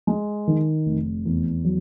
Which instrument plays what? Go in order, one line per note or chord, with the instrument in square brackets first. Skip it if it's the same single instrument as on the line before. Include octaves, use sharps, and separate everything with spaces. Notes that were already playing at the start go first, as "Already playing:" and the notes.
[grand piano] G#3
D#3
F1
E2
F#3